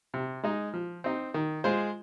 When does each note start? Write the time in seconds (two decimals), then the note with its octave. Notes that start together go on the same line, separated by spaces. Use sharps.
0.14 C3
0.43 G#3 D#4
0.74 F3
1.04 C4 D#4
1.34 D#3
1.64 G#3 F4 G#4 C5